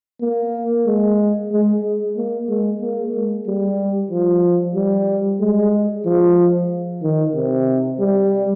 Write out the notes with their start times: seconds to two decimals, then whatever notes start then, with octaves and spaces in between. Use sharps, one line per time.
0.21 A#3
0.87 G#3
1.52 G#3
2.16 A#3
2.48 G#3
2.82 A#3
3.14 G#3
3.47 G3
4.11 F3
4.75 G3
5.40 G#3
6.06 F3
7.02 D#3
7.35 C3
7.99 G3